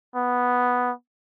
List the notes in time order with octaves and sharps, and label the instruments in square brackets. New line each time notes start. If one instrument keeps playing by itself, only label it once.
[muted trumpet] B3